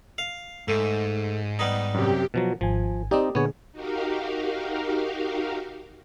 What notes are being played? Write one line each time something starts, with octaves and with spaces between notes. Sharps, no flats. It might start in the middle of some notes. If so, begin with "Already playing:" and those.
F5
G#2 A3
G3 B3 D#4
F#2 C3 G4
B2 F3 F#3
G#1 F3 G#5
C4 D#4 G4 D5 D#5
A#2 D3 B3 G#4 C#5
D#4 F#4 G4 A#4 F5